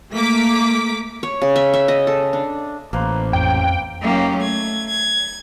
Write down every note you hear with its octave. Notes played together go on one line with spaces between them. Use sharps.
A3 A#3 D6 B6
C#5
C#3
E5
E5
D#5
A4
D4
A1 A#3 B4 C5
F2 G5
F#3 A#3 C#4 D#4 F4 G4
A3 G#6
G#6